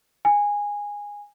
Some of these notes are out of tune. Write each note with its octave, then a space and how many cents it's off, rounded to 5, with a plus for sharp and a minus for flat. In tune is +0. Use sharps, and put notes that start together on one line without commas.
G#5 -15